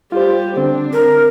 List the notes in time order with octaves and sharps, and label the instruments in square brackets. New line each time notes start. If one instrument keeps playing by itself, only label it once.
[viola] G3 G4 [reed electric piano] F4 C5
[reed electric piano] D3 C4 [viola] D4
[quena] A#4